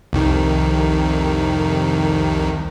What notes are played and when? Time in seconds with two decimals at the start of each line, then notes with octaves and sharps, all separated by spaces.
0.13 C2 F2 D#3